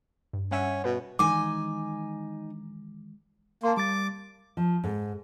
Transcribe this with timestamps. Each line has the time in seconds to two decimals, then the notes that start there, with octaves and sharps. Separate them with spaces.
0.33 G2
0.51 G3 C#4 E5 F#5
0.84 B2 F#4 B4
1.19 D#3 E3 G#3 D#4 G#5 D6
3.63 A#3 A5 C6
3.77 G3 D6 A6
4.57 F3
4.84 G#2